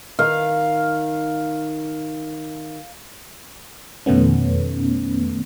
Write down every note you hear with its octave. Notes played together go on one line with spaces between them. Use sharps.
D#3 F5
F2 B2 D#3 A3 B3 C#4